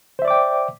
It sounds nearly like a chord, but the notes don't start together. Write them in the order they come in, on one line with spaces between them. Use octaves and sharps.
C5 E5 D5 D6 G5